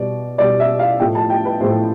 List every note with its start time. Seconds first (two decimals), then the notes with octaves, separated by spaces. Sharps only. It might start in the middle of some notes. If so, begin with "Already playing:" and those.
Already playing: B2 G3 D5
0.38 B2 G3 D5
0.60 E5
0.79 F5
0.99 A2 F3 A3 G5
1.15 A5
1.30 G5
1.45 B4
1.60 A2 F3 A3 C5